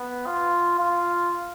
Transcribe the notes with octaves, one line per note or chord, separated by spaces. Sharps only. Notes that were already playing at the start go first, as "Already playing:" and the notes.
Already playing: B3
F4
F4